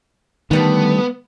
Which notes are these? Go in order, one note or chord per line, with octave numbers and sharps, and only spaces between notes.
D3 D#3 G3 A3 B3